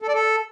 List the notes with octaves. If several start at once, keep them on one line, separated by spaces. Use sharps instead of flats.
A4
D5
A4